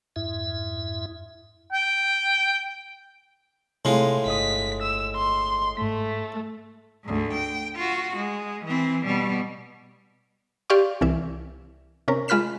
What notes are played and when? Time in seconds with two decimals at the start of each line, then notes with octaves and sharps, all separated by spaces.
0.16 F2 G#2 E4 E5
1.73 G5
3.85 A2 C3 G#3 F4
4.26 G1 D#5 D#6 B6
4.82 E6
5.16 C6
5.77 G#2 A3 B6
7.04 D2 G#2
7.33 G5
7.76 F4 F#4
8.16 G#3
8.65 E3 C4
9.05 B2 G3
10.70 G4 D5 F5 C6 C#6
11.01 C2 E3 E5
12.08 C3 C#4 A#4
12.28 G#3 F4 B5 F6 B6 E7